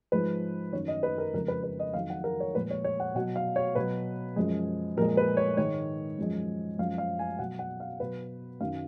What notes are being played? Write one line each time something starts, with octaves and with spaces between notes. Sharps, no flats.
G#2 F3 G#3 B4
F#2 D#3 F#3 C#5
D#5
B4
A#4
F2 C#3 F3 G#3 A#4
B4
B4
D#5
F2 D#3 F#3 F5
F#5
A#4
C#5
A#2 F3 G#3 B4
C#5
C#5
F#5
B2 F#3 F#5
F5
C#5
B2 F#3 B4
F#2 F3 G#3
A#2 F3 G#3 A#4
B4
C#5
G#2 D#3 G#3 C#5
F#2 F3 G#3
F#2 F3 G#3 F5
F5
G#5
B2 F#3 F#5
F#5
F5
B2 F#3 B4
F#2 D#3 F#3 F5